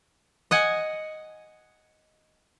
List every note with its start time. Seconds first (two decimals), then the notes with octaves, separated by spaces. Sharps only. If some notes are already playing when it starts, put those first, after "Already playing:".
0.51 D#5 F#5 G#5